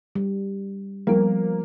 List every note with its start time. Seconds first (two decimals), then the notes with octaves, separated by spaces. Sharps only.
0.15 G3
1.07 F3 G3 A#3 B3